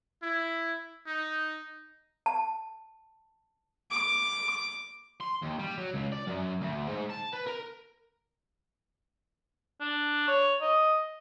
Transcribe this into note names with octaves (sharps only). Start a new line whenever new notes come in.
E4
D#4
A5
D6
C6
D#2
G3
F#3
C#2
D5
F#2
D2
G#2
A5
B4
A#4
D4
C#5
D#5